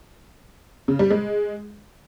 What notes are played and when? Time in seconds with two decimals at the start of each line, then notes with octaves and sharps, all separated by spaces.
0.88 C#3
0.99 G3
1.10 G#3